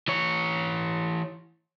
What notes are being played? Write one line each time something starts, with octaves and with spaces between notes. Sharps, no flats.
E3 C#5